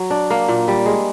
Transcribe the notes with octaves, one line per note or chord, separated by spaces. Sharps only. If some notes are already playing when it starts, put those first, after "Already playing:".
Already playing: F#3
D4
A#3
A#2
G3
G#3